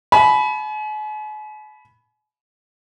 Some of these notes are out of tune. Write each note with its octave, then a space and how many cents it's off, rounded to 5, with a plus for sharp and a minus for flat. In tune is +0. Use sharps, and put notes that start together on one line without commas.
G#5 +45 B5 +0